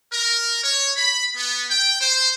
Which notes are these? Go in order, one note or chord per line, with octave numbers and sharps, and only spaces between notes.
A#4
C#5
B5
B3
G5
C5